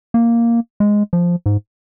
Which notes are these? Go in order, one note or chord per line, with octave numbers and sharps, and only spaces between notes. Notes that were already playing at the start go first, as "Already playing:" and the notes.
A#3
G#3
F3
G#2